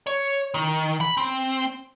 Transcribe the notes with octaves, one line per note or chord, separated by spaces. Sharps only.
C#5
D#3
B5
C4